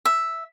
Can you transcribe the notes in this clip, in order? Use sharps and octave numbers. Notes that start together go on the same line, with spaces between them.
E5